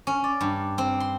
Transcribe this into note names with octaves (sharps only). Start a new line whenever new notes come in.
C#4
D5
G2
C4
C6